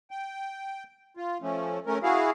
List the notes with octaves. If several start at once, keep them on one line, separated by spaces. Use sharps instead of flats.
G5
F4
F3 A3 C#4
A3 C#4 A#4
E4 F#4 G#4 F5